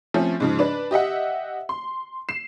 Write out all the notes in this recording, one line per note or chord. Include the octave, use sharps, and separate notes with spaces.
F3 A3 C4 C#4
G#2 C#3 F3
D4 B4
G4 D#5 E5 F#5
C6
C7 E7